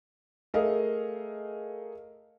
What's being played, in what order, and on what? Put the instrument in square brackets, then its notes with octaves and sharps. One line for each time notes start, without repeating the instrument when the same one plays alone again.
[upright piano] A3 G#4 A#4 D#5 F5